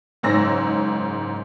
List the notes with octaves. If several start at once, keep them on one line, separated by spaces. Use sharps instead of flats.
F#1 G#2 C#5 E6 A#6